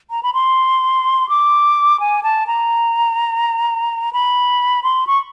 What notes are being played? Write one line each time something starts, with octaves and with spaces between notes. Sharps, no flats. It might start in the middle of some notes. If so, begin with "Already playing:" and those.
A#5
B5
C6
D6
G#5
A5
A#5
B5
C6
C#6